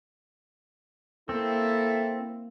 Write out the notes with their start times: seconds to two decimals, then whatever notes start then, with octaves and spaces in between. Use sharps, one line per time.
1.29 A#3 C4 E4 A4